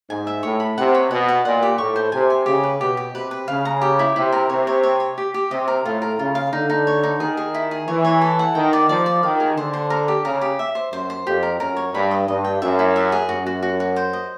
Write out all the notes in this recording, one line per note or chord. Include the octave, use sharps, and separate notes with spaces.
G#2 G#5
E5
A2 C#5
B5
C3 F#5
C#5
B2 F#5
F#5
A#2 F#5
G4
A2 C#6
C5
C3 G#5
G#5
C#3 G4
B4
B2 G4
G4
C3 B4
B4
C#3 F5
A#5
G4
E4
C3 E4
A#4
C3 C#5
C#5
C#5
C#5
G4
G4
C3 D#5
A#4
A2 F4
A#4
C#3 F4
F5
D3 D#4
D#4
C#5
D#4
D#3 G#4
G#4
E4
G#4
E3 C#5
C#5
A4
F#5
D#3 G5
D5
F3 D5
D5
D#3 F5
G#4
D3 C5
C5
A#4
G4
C#3 A#4
G4
E5
C5
F#2 C5
C5
F2 G4
A#4
F#2 A#4
C#5
G2 B5
D#5
G2 D#5
G5
F#2 E5
E4
E5
G#4
F#2 F#4
F#4
F#4
F#4
C5
D#5